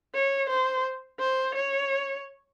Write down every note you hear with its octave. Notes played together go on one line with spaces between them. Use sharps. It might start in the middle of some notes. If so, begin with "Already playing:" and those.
C#5
C5
C5
C#5